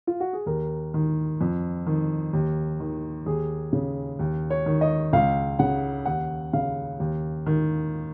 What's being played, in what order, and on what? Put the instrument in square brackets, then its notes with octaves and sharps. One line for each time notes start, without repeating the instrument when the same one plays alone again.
[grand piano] F4
F#4
G#4
D#2 A#4
D#3
F2
D#3
D#2
D#3
D#2 G#4
C#3
D#2
C#5
D#3
D#5
C#2 F5
C#3 F#5
D#2 F#5
C#3 F5
D#2
D#3